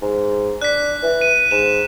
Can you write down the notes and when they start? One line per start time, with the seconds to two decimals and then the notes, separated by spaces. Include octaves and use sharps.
0.02 G#2
0.61 D4 F#6 B6
1.03 E3
1.21 D#7
1.51 G#2 E7